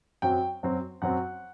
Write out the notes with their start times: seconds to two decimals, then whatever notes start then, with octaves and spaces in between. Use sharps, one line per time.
0.22 F#2 F#3 C4 G5
0.63 F#2 F#3 C4
1.02 F#2 F#3 C4 F#5